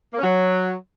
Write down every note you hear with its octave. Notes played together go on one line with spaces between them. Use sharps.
A#3
C#4
F#3